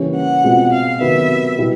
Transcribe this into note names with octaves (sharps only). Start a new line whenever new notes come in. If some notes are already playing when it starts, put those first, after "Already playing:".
Already playing: C#3 E3 G3 A#3 C#4
F#5
B2 G#3 C4 F4 G#4
F5
C3 D#3 F#3 B3 E5
B2 G3 B3 E4